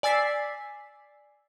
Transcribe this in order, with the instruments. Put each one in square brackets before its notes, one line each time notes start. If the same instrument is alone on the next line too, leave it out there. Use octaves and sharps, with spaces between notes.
[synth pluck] D5 G#5 E6 A6 B6 C7